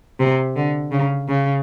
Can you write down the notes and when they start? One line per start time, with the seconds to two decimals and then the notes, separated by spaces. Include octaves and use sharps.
0.20 C3
0.56 D3
0.91 C#3
1.28 C#3